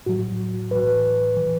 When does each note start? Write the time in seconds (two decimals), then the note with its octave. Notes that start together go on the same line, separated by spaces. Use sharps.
0.06 A2 F#3 F#4
0.71 A2 E3 B4
1.37 E3